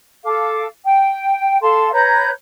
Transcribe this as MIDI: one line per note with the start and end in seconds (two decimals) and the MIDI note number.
0.24 0.65 69
0.24 0.65 77
0.24 0.65 86
0.84 1.58 79
1.61 1.91 69
1.61 1.91 77
1.61 1.91 81
1.61 1.91 84
1.92 2.30 71
1.92 2.30 73
1.92 2.30 82
1.92 2.30 91